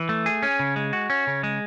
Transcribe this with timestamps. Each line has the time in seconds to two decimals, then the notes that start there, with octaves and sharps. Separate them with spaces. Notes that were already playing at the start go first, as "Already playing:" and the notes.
Already playing: E3
0.09 A3
0.26 G#4
0.43 C#4
0.59 C#3
0.76 G#3
0.93 F#4
1.10 C#4
1.27 C#3
1.43 G#3